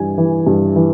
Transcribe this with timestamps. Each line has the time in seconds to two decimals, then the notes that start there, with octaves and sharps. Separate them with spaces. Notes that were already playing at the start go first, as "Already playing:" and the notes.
Already playing: G2 E3 G#5
0.18 E3
0.46 G2
0.76 E3